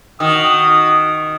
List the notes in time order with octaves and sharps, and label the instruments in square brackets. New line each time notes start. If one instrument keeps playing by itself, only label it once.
[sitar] D#3 [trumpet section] F#4 D#6